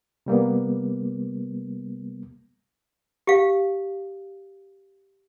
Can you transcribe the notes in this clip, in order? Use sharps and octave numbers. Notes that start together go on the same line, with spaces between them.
C3 G3 A#3 B3
G4 F5